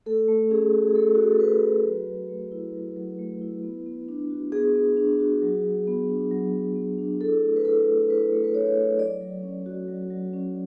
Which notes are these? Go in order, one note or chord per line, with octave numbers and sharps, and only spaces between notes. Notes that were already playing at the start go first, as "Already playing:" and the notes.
A3 A4
A3
C#4 G#4
F#4
G#4
A3 A4
A3 F#4
G#4
A4
C#4 B4
F#4
F#3
F#3
A3
E4
F#3
F#3
A3
E4
B3
B3
D4
F#4
B3 G#4
B3
D4
F#4
F#3
F#3
B3
D4
F#3
F#3
B3
D4
E4 A4
A3
B4
E4 A4
A3
E4 B4
A3
B4
E4 C#5
A3
F#3 D5
F#3
C#4
F#4
F#3
F#3
C#4